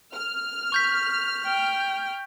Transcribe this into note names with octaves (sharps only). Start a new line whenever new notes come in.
F6
C#6 G6 B6
G5